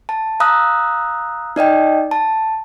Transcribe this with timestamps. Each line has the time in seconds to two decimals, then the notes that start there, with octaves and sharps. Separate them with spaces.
0.09 A5
0.40 F5 A#5 D#6 E6 F#6
1.56 D#4 D5 D#5 G5
2.11 A5